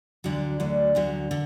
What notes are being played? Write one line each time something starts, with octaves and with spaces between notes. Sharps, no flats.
D2 D3 F#3 D4
D2 D3 F#3
D2 D3 F#3
D3